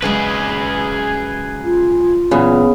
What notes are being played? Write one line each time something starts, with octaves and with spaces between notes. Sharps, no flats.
C#3 F#3 G#3 G#4 B4
F4
A#2 C#3 E3 F#3 B3